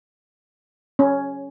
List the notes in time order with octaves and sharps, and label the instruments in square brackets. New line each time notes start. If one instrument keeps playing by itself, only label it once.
[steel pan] C#4